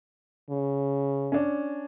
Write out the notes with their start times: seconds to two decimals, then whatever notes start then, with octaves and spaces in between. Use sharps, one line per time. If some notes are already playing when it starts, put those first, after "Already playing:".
0.50 C#3
1.32 C#4 D4